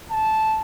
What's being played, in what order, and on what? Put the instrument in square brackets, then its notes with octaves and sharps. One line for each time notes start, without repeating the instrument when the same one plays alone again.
[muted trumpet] A5